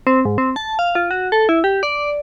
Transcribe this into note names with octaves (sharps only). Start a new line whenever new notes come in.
C4
G#2
C4
A5
F5
F4
F#4
A4
E4
G4
D5